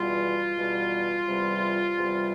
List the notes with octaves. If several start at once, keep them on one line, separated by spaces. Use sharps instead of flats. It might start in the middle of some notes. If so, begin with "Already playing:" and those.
Already playing: E2 B2 G3 F4
E2 B2 G3
E2 C3 G3
E2 C3 G3